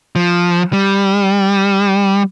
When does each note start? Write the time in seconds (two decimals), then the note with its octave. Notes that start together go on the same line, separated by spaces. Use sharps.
0.16 F3
0.73 G3